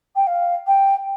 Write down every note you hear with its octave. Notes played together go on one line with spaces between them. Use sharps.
G5
F5
G5